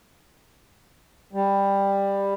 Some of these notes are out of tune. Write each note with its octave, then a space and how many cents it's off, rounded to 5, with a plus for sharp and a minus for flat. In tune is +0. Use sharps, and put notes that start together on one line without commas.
G3 +15